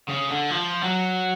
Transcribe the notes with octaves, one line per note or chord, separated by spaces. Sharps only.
C#3
D3
F3
F#3